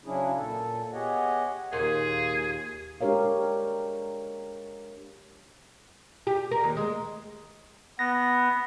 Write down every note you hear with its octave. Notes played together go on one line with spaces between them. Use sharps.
C#3 F#3 C#4 D4 E4 G#4
A#2 A4
B3 G4 G#4 C#5 D#5 F#5
D#2 A#2 G#4
G#3 D4 G4 A#4 C#5 F5
G4
A#4
D#2
G#3
B3 A#6